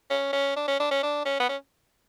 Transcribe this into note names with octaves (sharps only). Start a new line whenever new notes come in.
C#4
C#4
D4
C#4
D4
C#4
D4
C#4
B3
C#4